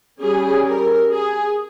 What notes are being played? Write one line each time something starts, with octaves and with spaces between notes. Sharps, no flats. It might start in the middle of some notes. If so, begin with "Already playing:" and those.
G3 C#4 G#4
A#4
G#4